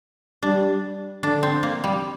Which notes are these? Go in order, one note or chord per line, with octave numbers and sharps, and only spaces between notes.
G3 D4
D3 D4
C4
A#3
G3